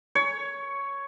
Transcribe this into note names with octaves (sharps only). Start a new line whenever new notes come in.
C#5